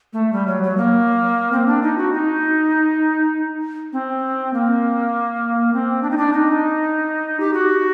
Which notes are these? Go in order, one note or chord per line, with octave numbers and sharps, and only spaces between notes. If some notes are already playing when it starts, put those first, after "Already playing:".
A3
G3
F#3
F#3
A#3
C4
D4
D#4
F#4
D#4
C4
A#3
C4
D4
D#4
D4
D#4
G4
F#4